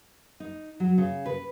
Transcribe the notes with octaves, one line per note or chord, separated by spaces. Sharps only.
D#4
F#3
C#3
B4